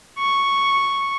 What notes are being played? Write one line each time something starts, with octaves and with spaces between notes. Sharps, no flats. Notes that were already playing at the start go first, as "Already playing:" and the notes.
C#6